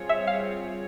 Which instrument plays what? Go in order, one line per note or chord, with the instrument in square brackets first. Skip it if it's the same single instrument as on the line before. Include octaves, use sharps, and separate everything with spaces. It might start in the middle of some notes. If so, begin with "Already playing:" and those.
Already playing: [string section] G3 C4 F4 G#4 C#5
[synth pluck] E5
F5